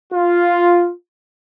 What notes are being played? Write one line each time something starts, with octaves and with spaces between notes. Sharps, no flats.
F4